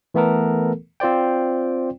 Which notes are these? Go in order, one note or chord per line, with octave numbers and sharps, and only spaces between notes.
E3 A3 B3 A4 A#4
C4 F4 C5 D5 G5